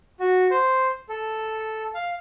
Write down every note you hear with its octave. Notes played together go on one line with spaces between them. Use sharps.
F#4
C5
A4
F5